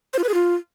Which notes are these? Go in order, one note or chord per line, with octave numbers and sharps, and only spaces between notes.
C5
F4
B4
G#4
F4